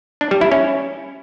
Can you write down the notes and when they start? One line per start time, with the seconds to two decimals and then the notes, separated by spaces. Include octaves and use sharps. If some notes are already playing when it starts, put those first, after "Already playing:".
0.21 D4
0.31 G3
0.41 E4
0.52 C#4